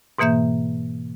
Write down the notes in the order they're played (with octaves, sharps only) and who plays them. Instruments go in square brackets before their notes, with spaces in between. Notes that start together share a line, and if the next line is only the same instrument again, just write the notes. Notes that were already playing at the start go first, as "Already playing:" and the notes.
[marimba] G#2 B2 E3 A#3 E5 G6